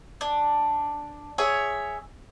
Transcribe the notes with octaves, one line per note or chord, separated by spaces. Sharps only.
D4
G#4 C#5 E5